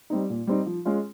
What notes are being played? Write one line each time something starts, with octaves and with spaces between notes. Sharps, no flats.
G3 C4 D#4
A#2
G3 C4 D#4
F3
G#3 C#4 F4